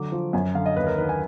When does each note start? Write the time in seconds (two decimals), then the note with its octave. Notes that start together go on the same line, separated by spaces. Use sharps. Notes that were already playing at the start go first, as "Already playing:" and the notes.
Already playing: D3 F#3 D6
0.12 F3
0.33 F#2 G#5
0.55 D3 F5
0.66 D#5
0.76 D#2 B4
0.87 A#4
0.98 D#3 B4
1.09 G#5